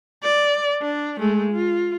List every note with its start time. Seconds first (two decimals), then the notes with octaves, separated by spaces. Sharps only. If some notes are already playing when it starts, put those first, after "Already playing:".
0.23 D5
0.82 D4
1.20 G#3 A3
1.52 F4